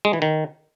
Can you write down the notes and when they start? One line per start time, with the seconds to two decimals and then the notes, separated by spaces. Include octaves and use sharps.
0.05 G#3
0.13 E3
0.22 D#3